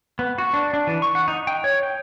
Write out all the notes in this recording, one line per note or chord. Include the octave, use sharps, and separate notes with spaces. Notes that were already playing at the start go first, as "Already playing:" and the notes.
B3
F#4
D4
D4
E3
C#6
F#5
D#4
G5
C#5
G5